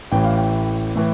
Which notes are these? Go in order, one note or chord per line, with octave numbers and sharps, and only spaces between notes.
A1 A2 E3 G5
F5
G5
A2 E3